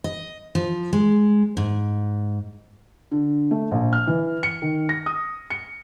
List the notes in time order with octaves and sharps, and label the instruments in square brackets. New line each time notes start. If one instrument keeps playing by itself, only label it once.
[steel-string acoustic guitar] D#5
F3
G#3
G#2
[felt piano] D3
A3
A#1
F6
E3
C#7
D#3
A#6
D#6
C#7